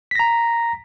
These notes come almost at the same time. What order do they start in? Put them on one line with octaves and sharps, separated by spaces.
B6 A#6 A#5